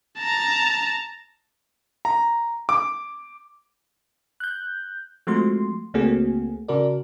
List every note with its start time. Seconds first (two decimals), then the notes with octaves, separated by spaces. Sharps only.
0.18 A5 A#5
2.05 A#5
2.69 D6
4.40 F#6 G6
5.27 F3 G#3 A3 C4 F#4 C6
5.94 C#2 A3 A#3 C4 F#4 G#4
6.68 C#3 F#4 A#4 D5